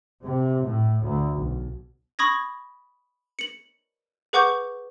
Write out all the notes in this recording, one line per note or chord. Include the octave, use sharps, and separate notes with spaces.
C3
A2
D2
B1
B5 C#6 D#6 G#6 A#6
C#7 F#7
G#4 B4 F#5 C#6 D6 G6